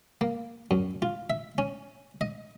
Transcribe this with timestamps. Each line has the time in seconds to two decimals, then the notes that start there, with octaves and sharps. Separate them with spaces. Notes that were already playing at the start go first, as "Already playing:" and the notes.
0.21 A#3
0.71 F#2
1.02 F4
1.30 E5
1.58 C#4
2.21 D#5